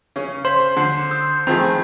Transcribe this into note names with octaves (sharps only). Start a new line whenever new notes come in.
C#3 C#4
C5 C6 B6
D3 C7
D#6 E6 G6
D#3 F3 A3 C4 G#4 B5